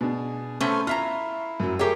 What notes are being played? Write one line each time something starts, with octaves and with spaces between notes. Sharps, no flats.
B2 D4 G#4
A3 B3 C#4 A4 C5 F6
E4 F4 E5 A#5 F6
F#2 F#3
A3 G4 G#4 A#4 C#5 G5